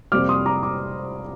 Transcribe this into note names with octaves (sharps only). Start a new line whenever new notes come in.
F2 C3 G3 A#3 D6 F6
C6 D#6
A#5 D6
A#5 D6